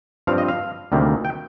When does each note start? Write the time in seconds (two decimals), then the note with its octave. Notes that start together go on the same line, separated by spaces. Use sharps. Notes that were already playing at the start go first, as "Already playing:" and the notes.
0.27 G2 F3 C4 F5
0.38 D#5
0.48 F5
0.92 D2 C3 D#3 G3 A#3
1.25 G5